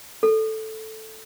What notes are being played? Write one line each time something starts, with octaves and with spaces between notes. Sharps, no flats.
A4